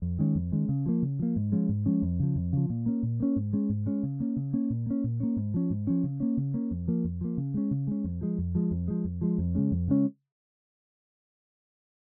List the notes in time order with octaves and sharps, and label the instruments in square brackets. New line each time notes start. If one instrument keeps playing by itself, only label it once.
[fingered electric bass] F2
D#3 G#3 C#4
F2
D#3 G#3 C#4
C#3
F3 A#3
C#3
F3 A#3
G#2
F3 G#3 C#4
G#2
F3 G#3 C#4
F2
C#3 F3
F2
C#3 F3
A#2
A#3 C#4
A#2
A#3 C#4
G#2
G#3 C#4
G#2
G#3 C#4
C#3
A#3 C#4
C#3
A#3 C#4
A#2
A#3 C#4
A#2
A#3 C#4
G#2
F3 C#4
G#2
F3 C#4
C#3
A#3 C#4
C#3
A#3 C#4
F2
F3 A#3
F2
F3 A#3
C#3
G#3 C#4
C#3
G#3 C#4
F2
F3 G#3
F2
F3 G#3
F2
F3 G#3
F2
F3 G#3
F2
C#3 G#3 C#4
F2
C#3 G#3 C#4